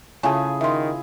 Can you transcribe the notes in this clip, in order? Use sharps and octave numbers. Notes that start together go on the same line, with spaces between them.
C#3 A3 E4 F4 G#4 G#5 A5
D#3 E5 C6